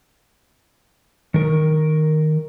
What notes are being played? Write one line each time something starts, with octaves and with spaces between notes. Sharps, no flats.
D#3 A#4